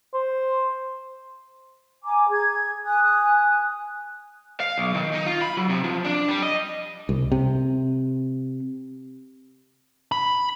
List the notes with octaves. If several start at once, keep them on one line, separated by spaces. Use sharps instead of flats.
C5
G#5 A#5 D6
G#4 G#6
G#5 D#6 F#6
F5
B1
D#3
D#4
F4
B5
F#3
C3
F3
D4
G3
D#5
C2
C3
B5